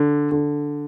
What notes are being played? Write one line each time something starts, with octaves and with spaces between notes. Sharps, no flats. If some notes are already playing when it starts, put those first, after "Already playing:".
Already playing: D3
D3